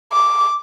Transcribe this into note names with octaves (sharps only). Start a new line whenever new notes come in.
D6